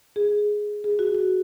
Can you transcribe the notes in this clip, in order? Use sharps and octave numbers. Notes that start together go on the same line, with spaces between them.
G#4
G#4
F#4
F#4